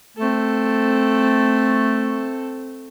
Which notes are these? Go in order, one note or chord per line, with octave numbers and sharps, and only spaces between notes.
A3 C4 A4